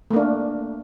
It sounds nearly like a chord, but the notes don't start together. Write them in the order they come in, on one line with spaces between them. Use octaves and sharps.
A3 A#3 D4